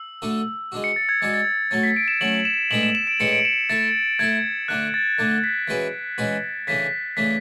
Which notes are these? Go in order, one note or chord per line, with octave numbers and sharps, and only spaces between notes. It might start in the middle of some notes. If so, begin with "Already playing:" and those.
Already playing: E6
D3 A3 D4 F#4 A4
G#3 D4 F#4
C#7
A6
G#6
G#3 D4 F#4 G#6
A6
G#6
F#3 A3 C#4 A6
B6
D7
E7
F#3 A3 C#4 F#7
E7
A2 G#3 B3 D4 A4 F#7
E7
E7
D7
A2 G#3 B3 D4 A4 C#7
D7
E7
A3 E4 A4 A6
A3 E4 A4 G#6
D3 A3 D4 F#6
A6
D3 A3 D4
B6
E3 G#3 C#4 F#4 B4
E3 G#3 C#4 F#4 B4
C#3 E3 A3 D4 B6
C#3 E3 A3 D4 B6